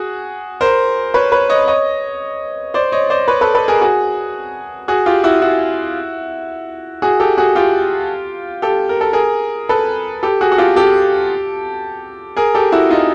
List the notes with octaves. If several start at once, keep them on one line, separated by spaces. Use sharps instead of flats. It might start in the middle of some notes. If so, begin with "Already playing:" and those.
Already playing: F#4 G#4
A#4 C5
B4 C#5
B4 C#5
C#5 D#5
C#5 D#5
C5 D5
C#5 D#5
C5 D5
B4 C#5
A4 B4
A4 B4
G#4 A#4
F#4 G#4
F#4 G#4
F4 G4
E4 F#4
E4 F#4
F#4 G#4
G4 A4
F#4 G#4
F4 G4
G4 A4
A#4
A4
G#4 A#4
A4 B4
G4 A4
F#4 G#4
F#4
F4 G4
G4 A4
G#4 A#4
G4 A4
E4 F#4
D#4 F4